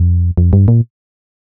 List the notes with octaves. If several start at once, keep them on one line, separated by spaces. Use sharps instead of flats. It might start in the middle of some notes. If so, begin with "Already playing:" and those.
Already playing: F2
F2
G2
A#2